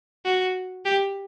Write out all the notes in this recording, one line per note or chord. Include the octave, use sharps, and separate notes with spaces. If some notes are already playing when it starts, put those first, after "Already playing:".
F#4
G4